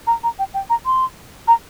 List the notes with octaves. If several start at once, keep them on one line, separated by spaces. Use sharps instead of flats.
A#5
A#5
G5
G5
A#5
C6
A#5